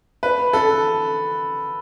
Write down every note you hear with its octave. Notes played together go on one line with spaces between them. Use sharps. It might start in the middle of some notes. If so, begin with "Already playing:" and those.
B4
A4